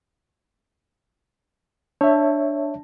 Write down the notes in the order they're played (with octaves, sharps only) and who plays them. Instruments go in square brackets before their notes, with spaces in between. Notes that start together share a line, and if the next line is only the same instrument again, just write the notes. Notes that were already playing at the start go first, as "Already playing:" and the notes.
[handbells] D4 [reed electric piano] C#5 E5